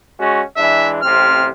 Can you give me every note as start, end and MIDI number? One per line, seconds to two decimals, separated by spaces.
0.18 0.42 56
0.18 0.42 61
0.18 0.42 66
0.57 0.99 52
0.57 0.99 56
0.57 0.99 62
0.57 0.88 76
1.02 1.48 33
1.02 1.48 48
1.02 1.48 60
1.02 1.45 89